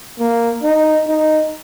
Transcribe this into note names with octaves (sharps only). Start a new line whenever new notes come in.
A#3
D#4
D#4